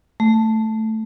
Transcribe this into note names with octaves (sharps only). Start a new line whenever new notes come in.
A3